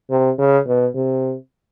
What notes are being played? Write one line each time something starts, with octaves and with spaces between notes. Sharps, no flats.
C3
C#3
B2
C3